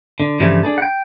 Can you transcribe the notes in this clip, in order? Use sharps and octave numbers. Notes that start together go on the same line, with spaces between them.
D3
G2 C#3 E3 F3 G3 A3
D4 G#4 A4
F#5 G5